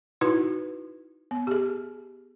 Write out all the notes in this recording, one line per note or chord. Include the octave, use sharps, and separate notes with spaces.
D#4 E4 F#4 B4
B3
G4 G#4